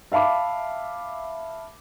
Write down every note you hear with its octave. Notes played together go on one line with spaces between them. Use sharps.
E5 F5 A5 B5 D6